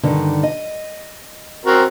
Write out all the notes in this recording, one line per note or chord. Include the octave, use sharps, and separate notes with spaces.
G2 D3 D#3
D#5
C4 F#4 A#4